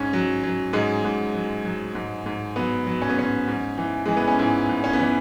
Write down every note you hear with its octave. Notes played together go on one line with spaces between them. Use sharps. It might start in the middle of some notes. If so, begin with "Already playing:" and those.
Already playing: G#2 C#4
F#3
F#3
G#2 G#3
G#2
F#3
F#3
G#2
G#2
F#3 B3
F#3
C#4
B3
G#2 C#4
G#2
E3
E3 G#3
B3
C#4
G#2 E4
G#2
C#4
B3
E3 C#4